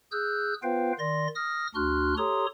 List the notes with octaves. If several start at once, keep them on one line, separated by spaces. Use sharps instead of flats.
G#4 E6 F#6 G6
B3 F4 B4 C5 F5 G5
D#3 D5 C6 A#6
D#6 F6 A#6
D2 D4 F#4 C6 F6 F#6
G4 A4 C#5 A#5 C6 D#6